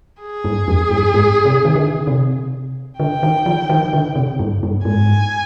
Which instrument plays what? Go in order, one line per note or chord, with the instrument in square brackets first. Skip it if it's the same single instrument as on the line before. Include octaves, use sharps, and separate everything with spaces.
[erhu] G#4
[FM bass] G2
F2
G2
G#2
C3
D#3
D3
C3
[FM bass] D3 [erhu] G5
[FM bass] D#3
F3
D#3
D3
C3
G2
G2
[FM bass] G#2 [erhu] G#5